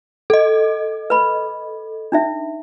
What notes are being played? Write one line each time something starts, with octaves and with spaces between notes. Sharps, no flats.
A4 D#5
B4 B5
D4 D#4 E5